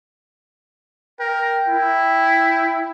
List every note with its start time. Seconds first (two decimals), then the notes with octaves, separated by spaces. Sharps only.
1.20 A#4 G5
1.68 E4